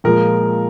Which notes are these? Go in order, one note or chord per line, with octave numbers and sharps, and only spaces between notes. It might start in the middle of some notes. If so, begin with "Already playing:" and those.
A#2 F3 G#3 A#4